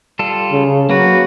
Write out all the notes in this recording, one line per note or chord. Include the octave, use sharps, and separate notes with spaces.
G3 F4 A4
C#3
F#3 A#3 F#4 B4